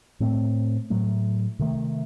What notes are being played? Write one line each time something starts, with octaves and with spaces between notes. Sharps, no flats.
A2 A3 C4
A2 F#3 A3
C3 D#3 A3